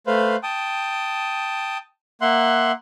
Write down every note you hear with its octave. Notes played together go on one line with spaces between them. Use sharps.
A3 B4 C5 F5
G5 A5 D#6
A#3 E5 F#5 C6 F#6